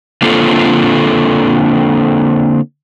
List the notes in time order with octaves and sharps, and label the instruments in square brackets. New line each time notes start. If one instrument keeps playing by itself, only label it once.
[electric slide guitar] D3 A#3 C4 F4 A4